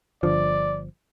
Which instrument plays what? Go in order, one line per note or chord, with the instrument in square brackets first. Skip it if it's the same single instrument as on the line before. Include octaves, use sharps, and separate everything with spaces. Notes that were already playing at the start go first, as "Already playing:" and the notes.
[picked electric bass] G1 D3 F3 [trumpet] D5